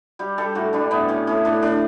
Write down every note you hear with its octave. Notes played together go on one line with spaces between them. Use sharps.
G3 G4
G3 A4
A2 F#4
G3 D4
A2 B3
A2 C#4
A2 C#4
A2 D4
A2 D4